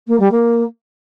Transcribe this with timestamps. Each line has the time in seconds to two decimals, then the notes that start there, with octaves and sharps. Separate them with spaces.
0.07 A#3
0.19 G3
0.31 A#3